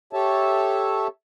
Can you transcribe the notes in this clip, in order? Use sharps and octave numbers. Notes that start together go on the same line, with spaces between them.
G4 A4 C#5 E5 A5